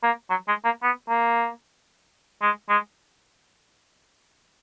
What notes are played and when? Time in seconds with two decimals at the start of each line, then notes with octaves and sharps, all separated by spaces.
0.03 A#3
0.30 F#3
0.48 G#3
0.64 A#3
0.82 B3
1.09 A#3
2.42 G#3
2.69 G#3